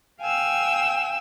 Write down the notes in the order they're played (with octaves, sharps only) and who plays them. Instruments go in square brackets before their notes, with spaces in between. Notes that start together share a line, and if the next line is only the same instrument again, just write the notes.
[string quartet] F5 G5 G#5 E6